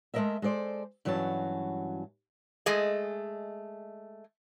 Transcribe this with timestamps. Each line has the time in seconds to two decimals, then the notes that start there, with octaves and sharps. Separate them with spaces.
0.14 G#3 A3 B3 A#4 D#5 E5
0.42 G#3 A4 C5 D5
1.05 G2 E3 F#3 C#4 F#4 A5
2.66 G#3 A3 G#4 D#5